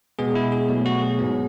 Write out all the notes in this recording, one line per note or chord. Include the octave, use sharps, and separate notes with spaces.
B2 G#3 B3 G#4
E4
G#4
B2 F#3 A3
F#4
G#4
G#2 F#3 B3